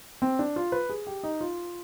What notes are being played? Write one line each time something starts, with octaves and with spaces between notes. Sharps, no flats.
C4
D4
F4
B4
G#4
G4
D#4
F4